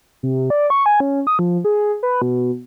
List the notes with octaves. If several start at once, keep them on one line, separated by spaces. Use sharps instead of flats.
C3
D5
C#6
G#5
C#4
D#6
F3
G#4
B4
B2